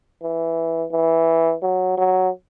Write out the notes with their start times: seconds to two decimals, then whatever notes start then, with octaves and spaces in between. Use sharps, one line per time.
0.23 E3
0.92 E3
1.62 F#3
1.97 F#3